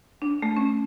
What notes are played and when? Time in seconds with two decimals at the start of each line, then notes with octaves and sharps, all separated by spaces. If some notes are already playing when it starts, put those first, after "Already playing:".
0.22 D4
0.42 A3
0.57 C#4